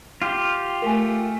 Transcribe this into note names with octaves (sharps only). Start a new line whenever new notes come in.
F4 G4
A3 A#4 G#5